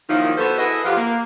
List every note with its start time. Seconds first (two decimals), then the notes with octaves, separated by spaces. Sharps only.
0.09 D#3 F3 F#3 A#3 D#4 E4
0.38 B3 F#4 A4 B4 C5
0.58 E4 G#4 A4 B4 D#5 F#5
0.84 F2 F3 F4 G4 F#5
0.97 A#3